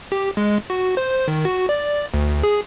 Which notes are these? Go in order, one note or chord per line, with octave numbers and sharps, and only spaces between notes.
G4
G#3
F#4
C5
D#3
F#4
D5
D2
G#4